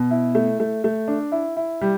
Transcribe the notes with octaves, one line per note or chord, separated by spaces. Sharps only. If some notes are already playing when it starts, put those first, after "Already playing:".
Already playing: B2
E4
A3
A3
A3
D4
E4
E4
G3